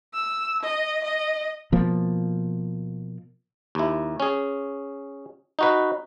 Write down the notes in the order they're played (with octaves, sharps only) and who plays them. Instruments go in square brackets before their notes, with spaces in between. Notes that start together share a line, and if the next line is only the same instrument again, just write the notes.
[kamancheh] E6
D#5
D#5
[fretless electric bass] B2 F3 A#3
[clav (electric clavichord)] D#2 E4
C#4 G#4
D#4 F#4 B4